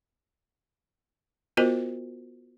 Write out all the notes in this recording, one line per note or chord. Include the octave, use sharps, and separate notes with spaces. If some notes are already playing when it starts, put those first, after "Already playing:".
B3 F4 F#4 A#4 C5 D#5